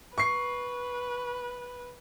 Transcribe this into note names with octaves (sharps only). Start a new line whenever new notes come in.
B4 C#6 C7